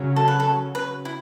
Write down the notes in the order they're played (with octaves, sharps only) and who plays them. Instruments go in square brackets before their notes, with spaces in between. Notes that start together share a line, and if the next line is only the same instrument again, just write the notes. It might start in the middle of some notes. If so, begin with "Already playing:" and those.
Already playing: [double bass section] C#3 F#3 C#4
[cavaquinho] A4
B4
A4
B4
E4